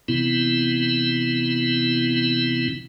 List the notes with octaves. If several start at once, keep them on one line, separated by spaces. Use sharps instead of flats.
C3 E3 B3 C4 E4